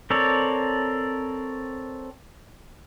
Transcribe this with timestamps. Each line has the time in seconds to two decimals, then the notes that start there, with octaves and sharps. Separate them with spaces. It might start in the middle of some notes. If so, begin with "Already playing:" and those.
0.10 C4 A4 A#4 C#5 D5